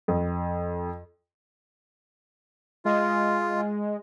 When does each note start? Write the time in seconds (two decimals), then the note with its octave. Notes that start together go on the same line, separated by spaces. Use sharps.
0.08 F2
2.85 G#3 F4